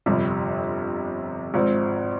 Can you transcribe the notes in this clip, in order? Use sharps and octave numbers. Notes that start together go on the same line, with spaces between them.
G1 F2 C3 G3
G#1 G#2 F3 C4